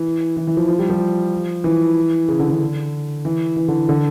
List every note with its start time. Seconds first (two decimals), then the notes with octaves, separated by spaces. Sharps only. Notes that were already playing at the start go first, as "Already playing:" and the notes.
Already playing: E3
0.37 E3
0.47 E3
0.57 F3
0.68 F3
0.79 G3
0.90 F3
1.64 E3
2.28 C#3
2.39 D3
2.50 D3
3.25 E3
3.57 E3
3.68 D3
3.89 D3